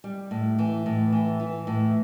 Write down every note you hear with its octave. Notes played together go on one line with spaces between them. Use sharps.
G3
A2
E3
A2
E3
E3
A2